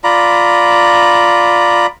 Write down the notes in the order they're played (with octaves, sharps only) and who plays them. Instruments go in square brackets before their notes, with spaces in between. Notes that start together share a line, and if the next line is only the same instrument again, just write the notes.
[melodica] F4 D5 A#5 B5